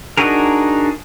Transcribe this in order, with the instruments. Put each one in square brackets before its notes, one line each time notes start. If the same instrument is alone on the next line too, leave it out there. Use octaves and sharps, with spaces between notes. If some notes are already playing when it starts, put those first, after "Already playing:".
[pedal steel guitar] D4 D#4 F#4 G#4 A#4